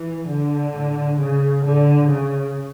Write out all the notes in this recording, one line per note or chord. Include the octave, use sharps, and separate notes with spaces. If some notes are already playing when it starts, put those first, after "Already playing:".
Already playing: E3
D3
A2
C#3
A2 D3
C#3